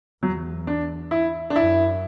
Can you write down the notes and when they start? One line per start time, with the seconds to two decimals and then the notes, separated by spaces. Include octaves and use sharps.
0.23 E2 F#3
0.67 D4
1.11 E4
1.50 D4
1.55 F#2 E4